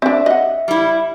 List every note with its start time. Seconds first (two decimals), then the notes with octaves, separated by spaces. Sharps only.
0.02 C4 D4 E5
0.26 D#5 F#5
0.68 G3 E4